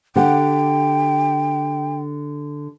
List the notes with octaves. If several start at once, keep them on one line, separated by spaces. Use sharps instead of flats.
D3 G4 F#5 G5